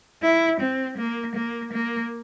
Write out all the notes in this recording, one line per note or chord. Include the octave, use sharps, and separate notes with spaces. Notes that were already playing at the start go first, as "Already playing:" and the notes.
E4
C4
A#3
A#3
A#3